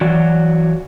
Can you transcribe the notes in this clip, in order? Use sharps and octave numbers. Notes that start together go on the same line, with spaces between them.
E3 F#3 F#4 D5